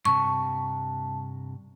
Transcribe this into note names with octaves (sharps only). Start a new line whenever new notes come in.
G2 C3 A5 C#6